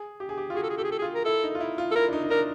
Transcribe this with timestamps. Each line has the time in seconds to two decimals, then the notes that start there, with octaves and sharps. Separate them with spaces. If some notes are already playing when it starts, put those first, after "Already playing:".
Already playing: G#4
0.20 G4
0.29 G#4
0.38 G4
0.50 F4
0.55 F#4 G#4
0.63 A4
0.70 G#4
0.77 G4 A4
0.84 G#4
0.91 A4
0.98 G#4
1.02 F4
1.14 A#4
1.25 E4 A4
1.44 D#4
1.55 F4
1.60 E4
1.78 F4
1.91 A4
1.95 E4 A#4
2.08 D4
2.13 D#4
2.23 D#4
2.30 D4 A#4